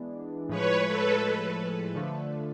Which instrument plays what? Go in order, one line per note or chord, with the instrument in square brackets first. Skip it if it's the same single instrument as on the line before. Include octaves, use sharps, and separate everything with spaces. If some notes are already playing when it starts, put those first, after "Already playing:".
Already playing: [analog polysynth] E3 G#3 B3 D4
[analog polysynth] A2 F3 G#3 [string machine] B4 C#5
[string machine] A4 B4
[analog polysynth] D3 F3 A3 D4